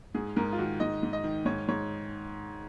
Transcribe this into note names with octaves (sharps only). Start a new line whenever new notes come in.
G#2 G#4
G#2 A#4
F4
D#3 F#4
G#2 D#5
G#2
D#5
D#3
G#2 C#5
G#2 C#5